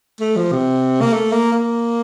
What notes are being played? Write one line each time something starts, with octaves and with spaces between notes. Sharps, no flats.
A3
F3
C3
A#3
A3
A#3
A#3